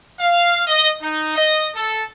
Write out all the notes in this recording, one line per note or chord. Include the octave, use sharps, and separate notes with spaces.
F5
D#5
D#4
D#5
A4